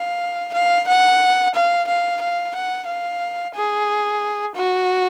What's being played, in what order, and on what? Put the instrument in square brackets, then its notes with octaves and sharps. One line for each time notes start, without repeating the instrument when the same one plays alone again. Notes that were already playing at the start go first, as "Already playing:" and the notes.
Already playing: [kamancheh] F5
F5
F#5
F5
F5
F5
F#5
F5
G#4
F#4